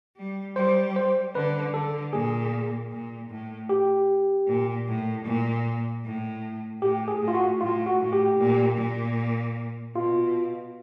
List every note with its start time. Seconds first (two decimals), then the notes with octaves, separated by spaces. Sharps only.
0.17 G3
0.56 G3 C5
0.96 C5
1.35 D3 B4
1.74 D3 A4
2.13 A#2 G#4
2.92 A#2
3.30 A2
3.69 G4
4.47 A#2
4.87 A2
5.25 A#2
6.04 A2
6.82 A2 G4
7.08 G#4
7.21 A2
7.28 F4
7.34 F#4
7.60 A2 F4
7.86 F#4
8.00 A2
8.13 G4
8.39 A#2
8.77 A#2
9.95 B2 F4